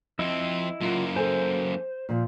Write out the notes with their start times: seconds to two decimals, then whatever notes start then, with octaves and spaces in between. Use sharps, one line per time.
0.19 F2 C4 E4 D#5 E6
0.81 F#2 F#3 A#3 F4
1.16 A4 C5 G#5
2.09 A#2 F3